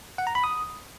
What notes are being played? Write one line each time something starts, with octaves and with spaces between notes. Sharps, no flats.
F#5
A#5
B5
D#6